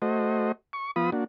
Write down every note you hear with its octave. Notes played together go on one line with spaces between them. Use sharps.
A3 F#4 C5 D#5
C#6
F3 B3 F4 B5 D#6
A#3 D4 F#4